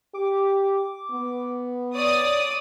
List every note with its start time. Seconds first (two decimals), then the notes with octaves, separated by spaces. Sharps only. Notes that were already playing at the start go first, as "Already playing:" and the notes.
0.14 G4 D6
1.11 B3
1.94 C#5 D5 D#6